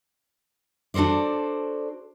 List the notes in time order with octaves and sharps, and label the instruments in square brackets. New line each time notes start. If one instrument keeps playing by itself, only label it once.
[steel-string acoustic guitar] D4 F#4 A4 C5 D5